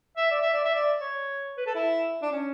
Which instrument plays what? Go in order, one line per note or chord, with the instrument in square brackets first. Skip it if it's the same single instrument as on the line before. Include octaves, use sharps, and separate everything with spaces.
[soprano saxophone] E5
D5
E5
D5
E5
D5
C#5
B4
A4
E4
D4
C#4